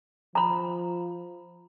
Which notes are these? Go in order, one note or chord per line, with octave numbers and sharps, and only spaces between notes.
F3 A#5 B5